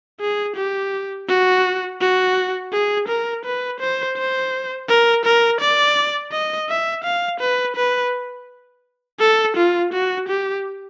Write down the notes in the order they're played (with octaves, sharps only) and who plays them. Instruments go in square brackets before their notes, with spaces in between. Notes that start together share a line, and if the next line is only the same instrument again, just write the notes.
[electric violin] G#4
G4
F#4
F#4
G#4
A#4
B4
C5
C5
A#4
A#4
D5
D#5
E5
F5
B4
B4
A4
F4
F#4
G4